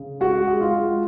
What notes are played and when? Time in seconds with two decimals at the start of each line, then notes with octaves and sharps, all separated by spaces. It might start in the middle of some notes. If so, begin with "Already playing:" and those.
Already playing: C#3
0.20 G#3 F#4 F#5
0.48 G#3
0.61 F4 F5
0.73 G#3